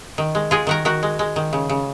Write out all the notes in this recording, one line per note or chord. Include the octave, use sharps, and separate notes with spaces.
D#3
G#3
G#3 F4 G#4
D#3 F#4 A#4
D#3 F#4 A#4
G#3
G#3
D#3
C#3
C#3